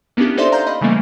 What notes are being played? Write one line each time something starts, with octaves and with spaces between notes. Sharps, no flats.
A#3 B3 C#4 D4 E4 G4
D#4 A4 C5 D5 E5 C6
F5 A#5 C6 F6 G6
D#5 B5
C#3 E3 G3 A3 A#3